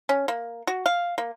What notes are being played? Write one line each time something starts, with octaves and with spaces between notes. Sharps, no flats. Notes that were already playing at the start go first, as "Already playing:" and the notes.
C#4
A#3
F#4
F5
A#3